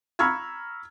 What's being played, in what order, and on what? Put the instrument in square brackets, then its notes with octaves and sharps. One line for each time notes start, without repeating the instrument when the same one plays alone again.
[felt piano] A#5 B5 C#6 E6 F6 G#6